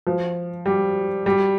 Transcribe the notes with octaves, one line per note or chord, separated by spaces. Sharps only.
F3
G3
G3